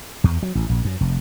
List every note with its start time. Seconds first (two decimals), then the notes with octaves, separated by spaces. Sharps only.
0.24 E2
0.43 F#3
0.55 A1
0.69 A#1
0.85 F#2
1.01 F1